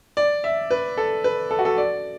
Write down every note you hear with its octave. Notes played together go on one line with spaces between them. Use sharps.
D5
E5
B4
A4
B4
A4
F#4
A4
D5